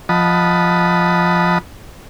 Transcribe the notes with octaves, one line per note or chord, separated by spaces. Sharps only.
F3 D#5 F#5 A5 B5